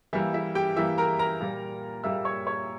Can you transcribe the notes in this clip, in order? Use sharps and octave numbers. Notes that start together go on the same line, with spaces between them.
E3 G3 A#3 E4 E5
E4 E5
G4 G5
E3 G3 A#3 E4 E5
A#4 A#5
A#4 A#5
A#2 G3 A#3
A#2 G3 A#3 E5 E6
C#5 C#6
C#5 C#6